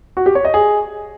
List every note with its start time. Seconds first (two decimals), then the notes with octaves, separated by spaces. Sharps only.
0.17 F#4
0.26 G4
0.35 C#5
0.45 D#5
0.54 G#4